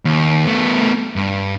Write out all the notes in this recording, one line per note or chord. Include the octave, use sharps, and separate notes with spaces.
D#2
A3 B3
G2